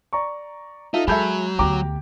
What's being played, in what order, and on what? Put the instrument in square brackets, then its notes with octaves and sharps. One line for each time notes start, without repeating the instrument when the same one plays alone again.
[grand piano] D5 A#5 C#6
[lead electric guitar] D#4 [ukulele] F4 A4 E5
[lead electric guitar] F#3 [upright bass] G#3 [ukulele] G#4 A4 E5 [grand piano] B5 G6 G#6
[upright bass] D2 B3 [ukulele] G4 [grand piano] A#5 D6